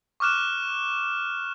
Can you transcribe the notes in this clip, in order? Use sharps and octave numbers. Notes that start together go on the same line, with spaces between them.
C#6 D6 F6 F#6 E7